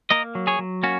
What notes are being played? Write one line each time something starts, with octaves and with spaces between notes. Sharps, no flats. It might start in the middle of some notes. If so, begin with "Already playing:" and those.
A#3 A#4 D#5
F#3
G#4 C#5
F#3
A#3 C#4 F#4